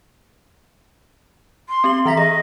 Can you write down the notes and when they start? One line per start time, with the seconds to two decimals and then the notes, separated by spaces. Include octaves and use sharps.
1.69 C6
1.84 C4 G4 F#7
2.05 E3 E5 A#5 B6
2.17 G#4 D#5